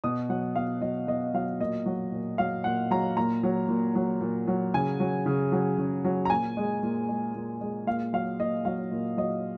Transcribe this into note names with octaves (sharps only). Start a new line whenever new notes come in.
B2 D#6
F#3 F#5
B2 F5
F#3 D#5
B2 D#5
F#3 F5
A#2 D#5
F#3
A#2
F#3 F5
A#2 F#5
F#3 A#5
A#2 A#5
F#3
A#2
F#3
A#2
F#3
C#3 G#5
F#3
C#3
F#3
C#3
F#3
A#5
A#2 G#5
G#3
A#2
G#3
A#2
G#3
A#2 F5
F#3 F5
A#2 D#5
F#3 F5
A#2
F#3 D#5